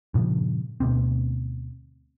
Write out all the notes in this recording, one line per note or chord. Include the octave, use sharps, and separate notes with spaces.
G2 A#2 C#3 F3
D2 B2 C4